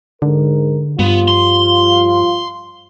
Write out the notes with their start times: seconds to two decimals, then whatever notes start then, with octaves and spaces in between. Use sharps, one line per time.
0.22 G#2 D3 A#4
0.99 G2 F3 G3 B3 F4
1.28 C6